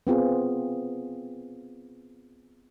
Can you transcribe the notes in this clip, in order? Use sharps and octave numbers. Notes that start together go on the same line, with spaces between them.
B3 C4 F4 G#4